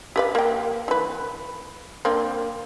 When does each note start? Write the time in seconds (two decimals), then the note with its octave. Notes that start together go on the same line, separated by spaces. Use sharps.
0.16 G4 B4 F5
0.35 A#3 G5
0.88 E3 B4
2.05 A#3 C4 D4